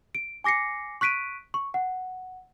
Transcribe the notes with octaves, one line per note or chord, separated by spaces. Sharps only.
D7
G#5 D6 A#6 C7 C#7
C#6 F#6 B6 D7 D#7
C#6
F#5